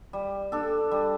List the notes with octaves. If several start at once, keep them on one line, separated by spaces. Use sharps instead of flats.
G3
D4 A4
G3